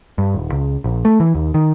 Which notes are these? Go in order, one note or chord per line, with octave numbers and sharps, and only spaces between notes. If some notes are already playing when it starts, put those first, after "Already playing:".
G2
D#1
C#2
A#1
A3
E3
D#2
D#3